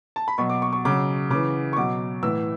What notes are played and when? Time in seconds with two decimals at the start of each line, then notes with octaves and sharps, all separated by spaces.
0.16 A5
0.28 B5
0.38 B2 F#3 C#6
0.50 D6
0.62 C#6
0.73 C#6
0.85 C#3 F#3 D6
1.30 C#3 E3 D6
1.73 C#6
1.77 B2 F#3 D6
2.23 A2 E3 E6